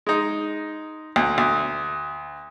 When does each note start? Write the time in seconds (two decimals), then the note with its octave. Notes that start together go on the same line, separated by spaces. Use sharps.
0.07 G#3 D#4
1.16 D2
1.38 D2